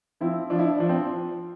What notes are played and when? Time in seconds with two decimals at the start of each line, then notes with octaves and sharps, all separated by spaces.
0.21 F3 C4 E4
0.50 F3 D4
0.59 E4
0.67 D4
0.80 F3 D4
0.89 C4